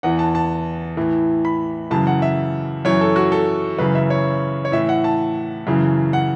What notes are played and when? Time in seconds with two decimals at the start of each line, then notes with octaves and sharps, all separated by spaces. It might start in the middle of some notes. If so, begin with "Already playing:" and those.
0.03 E2 E3 F#5
0.19 A5
0.35 A5
0.97 A2 E3
1.45 B5
1.91 F#2 C#3 E3 A5
2.07 F#5
2.22 E5
2.85 F#2 E3 C#5
3.01 A4
3.16 F#4
3.32 A4
3.78 F#2 C#3 E3 B4
3.95 E5
4.10 C#5
4.65 C#5
4.72 A2 E3 E5
4.89 F#5
5.04 A5
5.67 F#2 C#3 E3
6.13 F#5